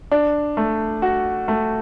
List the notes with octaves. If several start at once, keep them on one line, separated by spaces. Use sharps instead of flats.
D4
A3
F#4
A3